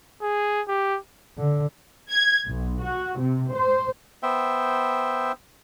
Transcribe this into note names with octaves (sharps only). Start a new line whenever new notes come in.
G#4
G4
D3
G#6
B1
F#4
C3
C5
B3 C5 E5 G5